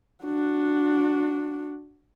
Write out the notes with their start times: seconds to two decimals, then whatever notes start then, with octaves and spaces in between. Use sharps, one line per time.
0.24 D4 F#4